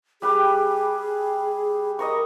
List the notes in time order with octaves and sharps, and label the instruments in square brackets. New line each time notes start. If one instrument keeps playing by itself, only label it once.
[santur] G3 G4 B4 [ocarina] G#4
[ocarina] A#4 [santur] D#5 A#5 C#6